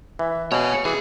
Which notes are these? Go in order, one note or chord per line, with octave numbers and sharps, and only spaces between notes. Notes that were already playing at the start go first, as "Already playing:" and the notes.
E3 E5
B2 C#5 F5 G#5
C#7
E3 G#4 D#6